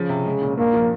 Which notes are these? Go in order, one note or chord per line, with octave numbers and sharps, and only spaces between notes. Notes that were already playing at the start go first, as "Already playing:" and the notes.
Already playing: C#3 F3
C3
G#3
A#2
G2 A#3
F3